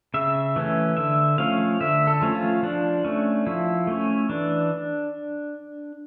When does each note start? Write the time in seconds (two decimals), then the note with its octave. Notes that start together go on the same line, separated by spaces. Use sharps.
0.14 C#3 E5
0.56 E3 A3 C#4
0.97 D3 E5
1.38 F3 A3 C#4 F5
1.81 D3 E5
2.07 A4
2.21 F3 A3 C#4
2.35 F4
2.63 F3 D4
3.04 A3 C#4
3.46 F3 E4
3.87 A3 C#4
4.29 E3 D4